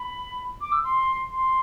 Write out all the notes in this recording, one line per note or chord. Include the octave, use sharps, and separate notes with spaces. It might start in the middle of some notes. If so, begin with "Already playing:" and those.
Already playing: B5
D6
E6
C6
C6